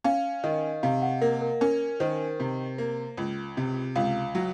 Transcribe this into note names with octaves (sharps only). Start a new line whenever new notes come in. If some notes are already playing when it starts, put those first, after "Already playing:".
C#4 F5
D#3 D#5
C3 F5
F#5
A#3 A#4
A#4
C#4 A#4
D#3 C5
C3
A#3
C#2
C3
C#2 F5
F#3